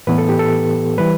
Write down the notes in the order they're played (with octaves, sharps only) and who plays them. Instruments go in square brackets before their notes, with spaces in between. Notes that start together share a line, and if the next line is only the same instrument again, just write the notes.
[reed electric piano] A2 E3 B3 B4
A4
G4
A4
E3 G3 B4